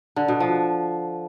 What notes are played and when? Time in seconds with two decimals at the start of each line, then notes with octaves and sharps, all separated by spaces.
0.16 D3
0.28 B2
0.40 F3